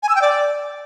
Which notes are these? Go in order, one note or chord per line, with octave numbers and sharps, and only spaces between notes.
G#5
E6
G5
D5